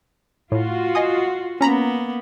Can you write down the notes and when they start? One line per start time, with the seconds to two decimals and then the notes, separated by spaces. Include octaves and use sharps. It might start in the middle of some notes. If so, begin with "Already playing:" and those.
0.52 A2 F4 F#4
0.95 D#5 G#5 D#6
1.61 A#3 B3 C#4 A#5 B5